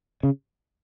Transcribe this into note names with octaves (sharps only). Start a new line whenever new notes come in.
C#3